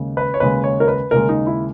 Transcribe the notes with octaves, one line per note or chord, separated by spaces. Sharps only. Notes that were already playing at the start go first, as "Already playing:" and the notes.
Already playing: D#2 C#3 G#3
B4
C#5
D#2 C#3 G#3 B4
C#5
A#4
B4
D#2 C#3 G#3 A#4
D#4
E4